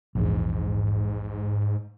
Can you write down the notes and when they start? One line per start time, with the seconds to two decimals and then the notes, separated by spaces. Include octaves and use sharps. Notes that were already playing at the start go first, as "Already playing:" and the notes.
0.15 A#1 E2 G#2